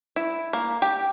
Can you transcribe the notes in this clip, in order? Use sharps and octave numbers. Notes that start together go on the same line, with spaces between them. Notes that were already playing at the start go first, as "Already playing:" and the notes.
E4
A#3
G4